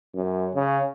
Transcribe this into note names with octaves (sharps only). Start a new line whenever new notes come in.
F#2
C#3